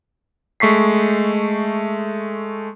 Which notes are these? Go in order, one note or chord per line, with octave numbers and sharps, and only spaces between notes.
G#3 A3 C#6 B6 C7